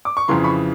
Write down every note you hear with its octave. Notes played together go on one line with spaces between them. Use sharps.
D6
C#6
F2 C#3 E3 A#5 C6
B5 C#6